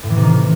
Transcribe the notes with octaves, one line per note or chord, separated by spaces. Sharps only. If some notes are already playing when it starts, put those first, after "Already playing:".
A2
E3
C3
D#3